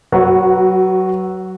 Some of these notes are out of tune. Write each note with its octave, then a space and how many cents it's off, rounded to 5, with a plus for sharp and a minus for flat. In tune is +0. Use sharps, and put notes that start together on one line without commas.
F#3 +20 F#4 -10 B4 -10